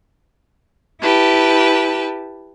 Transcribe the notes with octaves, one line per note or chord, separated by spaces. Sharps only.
E4 G4 B4 A5